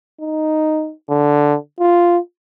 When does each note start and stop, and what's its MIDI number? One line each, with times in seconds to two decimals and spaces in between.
0.21 0.92 63
1.10 1.56 50
1.80 2.19 65